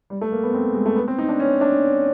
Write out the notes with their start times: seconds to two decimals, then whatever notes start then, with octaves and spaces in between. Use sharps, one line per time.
0.10 G3
0.21 A3
0.32 A#3
0.43 B3
0.54 C4
0.74 G#3
0.86 A3
0.96 B3
1.08 C4
1.18 D#4
1.29 D4
1.40 C#4
1.61 D4